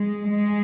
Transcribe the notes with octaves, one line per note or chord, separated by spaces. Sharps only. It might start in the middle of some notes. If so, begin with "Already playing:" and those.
Already playing: G#3
G#3